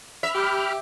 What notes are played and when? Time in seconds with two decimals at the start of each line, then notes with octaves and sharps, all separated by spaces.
0.23 E5 B5 F6
0.35 G4